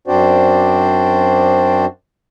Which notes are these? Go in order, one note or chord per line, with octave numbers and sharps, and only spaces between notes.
F#2 C4 D4 F#4 C5 D5